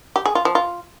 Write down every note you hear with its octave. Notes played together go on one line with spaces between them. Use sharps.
G4
G#4
F4
F3
F4